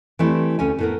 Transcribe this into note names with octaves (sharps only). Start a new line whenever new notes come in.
E3 G3 A3 C4 E4
D2 C#4 G#5
A2 B3 A#4